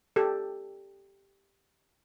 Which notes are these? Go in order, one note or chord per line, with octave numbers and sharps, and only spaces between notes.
G4 A4